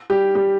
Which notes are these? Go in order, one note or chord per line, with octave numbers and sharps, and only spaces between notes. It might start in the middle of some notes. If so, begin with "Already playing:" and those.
G3 G4
G3 G4